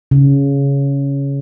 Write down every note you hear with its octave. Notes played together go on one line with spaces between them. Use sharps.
C#3